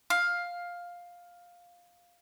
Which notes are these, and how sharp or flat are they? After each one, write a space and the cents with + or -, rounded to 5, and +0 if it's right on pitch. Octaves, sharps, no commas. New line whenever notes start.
F5 +10